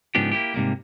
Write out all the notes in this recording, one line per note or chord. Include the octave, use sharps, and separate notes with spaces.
G#2 C#3 F3 B3 D4 G4
A#3 B3 E4 G4
G#2 C3 G3 A#3